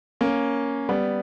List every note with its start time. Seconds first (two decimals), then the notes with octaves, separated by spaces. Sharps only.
0.21 A#3 C#4
0.89 G3 B3